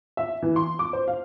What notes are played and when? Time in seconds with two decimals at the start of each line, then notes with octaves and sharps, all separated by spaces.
0.17 E5
0.42 E3
0.56 C6
0.79 D6
0.93 C5
1.08 F5